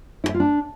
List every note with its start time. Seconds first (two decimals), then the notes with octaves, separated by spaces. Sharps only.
0.24 E4
0.29 E5
0.34 F4
0.40 D4